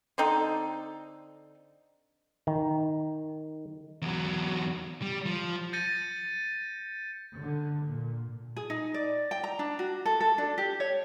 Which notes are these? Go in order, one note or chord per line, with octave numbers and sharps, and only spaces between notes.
D3 C4 D#4 A4
D#3
E2 F#3
G3
F3
G6 A6 A#6 C#7 D#7
D3
A#2
G#4
D#4
D5
G5
A#5
D4
F#4
A4
A4
D4
G4
C#5